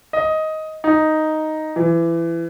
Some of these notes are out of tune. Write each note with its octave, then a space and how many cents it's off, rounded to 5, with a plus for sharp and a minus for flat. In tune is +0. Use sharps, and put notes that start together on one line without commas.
D#5 +10
D#4 +0
E3 +25